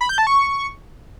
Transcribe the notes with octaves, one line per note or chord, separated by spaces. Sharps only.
B5
G6
A5
C#6